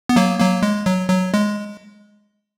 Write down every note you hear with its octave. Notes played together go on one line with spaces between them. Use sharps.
B3
F#3 A#3
F#3 A#3
G#3
F#3
F#3
G#3